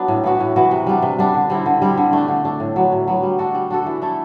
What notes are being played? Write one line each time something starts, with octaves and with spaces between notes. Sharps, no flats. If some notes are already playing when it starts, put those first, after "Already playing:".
Already playing: F#3 B3 D4
A2
E3 B3 F#4
A2
E3 B3 F#4
C3
G3 B3 D4
C3
G3 B3 D4
D3
G3 C4 E4
D3
G3 C4 E4
D3
A3 D4
D3
A3 D4
A2
F#3 B3
A2
F#3 B3
G3
D4 F#4 A4
G3
D4 F#4 A4
E3
A3 E4 A4